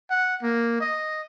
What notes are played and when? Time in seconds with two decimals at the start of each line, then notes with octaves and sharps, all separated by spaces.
0.10 F#5
0.42 A#3
0.80 D#5